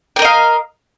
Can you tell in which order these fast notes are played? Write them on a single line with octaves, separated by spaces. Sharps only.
G5 A#4 D#5 F5